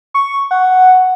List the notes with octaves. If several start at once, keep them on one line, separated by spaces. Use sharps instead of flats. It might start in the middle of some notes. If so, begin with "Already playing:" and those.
C#6
F#5